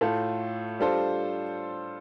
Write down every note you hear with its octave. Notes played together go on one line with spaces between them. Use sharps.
A2 A3 F4 A4
G3 D4 F4 A4 C5